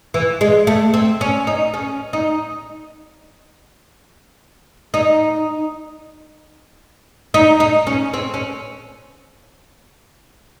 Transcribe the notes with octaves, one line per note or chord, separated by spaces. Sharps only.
E3
G#3
A3
C4
C#4
D#4
C#4
D#4
D#4
D#4
D#4
C#4
C4
C#4